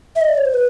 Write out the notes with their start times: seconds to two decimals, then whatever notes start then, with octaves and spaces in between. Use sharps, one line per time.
0.16 E5
0.21 D#5
0.29 D5
0.38 C#5
0.45 C5
0.54 B4